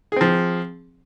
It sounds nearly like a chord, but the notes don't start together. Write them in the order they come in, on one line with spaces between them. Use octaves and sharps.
G#4 C4 F3